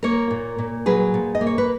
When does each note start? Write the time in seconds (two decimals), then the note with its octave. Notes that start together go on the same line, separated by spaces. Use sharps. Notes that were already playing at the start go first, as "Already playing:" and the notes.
0.03 A#3 A#4 C#5
0.31 A#2
0.59 A#2
0.86 F#3 G#4 B4
1.14 A#2
1.35 D#5
1.41 A#3
1.47 C#5
1.58 B4